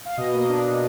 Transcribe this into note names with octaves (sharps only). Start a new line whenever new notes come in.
F5
B2 D#5
A#3 D#5
D4
B2